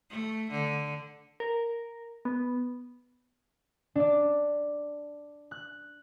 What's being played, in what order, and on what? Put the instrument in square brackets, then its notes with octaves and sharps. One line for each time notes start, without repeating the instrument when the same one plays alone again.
[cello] A3
D3
[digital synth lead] A#4
B3
[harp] D4 D5
F#6